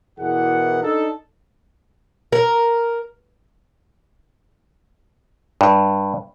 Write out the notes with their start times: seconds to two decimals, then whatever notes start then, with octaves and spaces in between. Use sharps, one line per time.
0.18 E2 B2 E3 G#4 A#4 F#5
0.82 D4 D#4 A4
2.32 A#4
5.61 G2